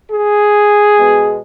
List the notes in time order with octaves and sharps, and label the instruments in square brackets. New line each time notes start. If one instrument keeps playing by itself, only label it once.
[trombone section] G#4
B2 G#3 B3